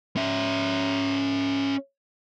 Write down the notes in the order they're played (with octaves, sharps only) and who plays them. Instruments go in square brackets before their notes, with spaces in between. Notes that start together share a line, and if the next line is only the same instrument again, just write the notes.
[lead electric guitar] C#4 E5